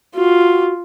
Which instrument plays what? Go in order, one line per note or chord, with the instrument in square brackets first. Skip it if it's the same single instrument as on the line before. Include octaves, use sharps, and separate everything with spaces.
[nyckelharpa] F4 [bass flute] F#4